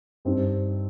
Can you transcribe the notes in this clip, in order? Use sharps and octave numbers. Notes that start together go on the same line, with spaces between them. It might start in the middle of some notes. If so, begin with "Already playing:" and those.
G2 G3 C4 D#4 G4